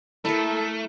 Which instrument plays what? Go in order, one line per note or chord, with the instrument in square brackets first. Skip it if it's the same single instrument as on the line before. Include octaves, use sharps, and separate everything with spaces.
[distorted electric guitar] A3 [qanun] E4 A#4 [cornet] A4